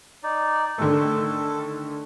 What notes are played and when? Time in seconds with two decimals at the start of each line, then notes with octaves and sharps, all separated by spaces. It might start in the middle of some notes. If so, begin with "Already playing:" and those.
0.23 D#4 D5
0.78 D3 D#3 A3 A4